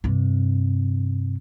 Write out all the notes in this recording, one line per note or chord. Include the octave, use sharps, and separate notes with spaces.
G2 C3